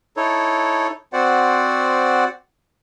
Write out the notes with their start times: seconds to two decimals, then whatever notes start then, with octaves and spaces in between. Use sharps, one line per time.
0.17 D#4 E4 A4 C#5
1.13 C4 F#4 C5 D5 F#5